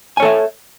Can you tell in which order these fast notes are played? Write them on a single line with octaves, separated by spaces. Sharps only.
G#5 C#5 A4 E5